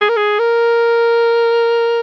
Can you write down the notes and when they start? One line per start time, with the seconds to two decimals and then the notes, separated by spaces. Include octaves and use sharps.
0.01 G#4
0.09 A#4
0.16 G#4
0.39 A#4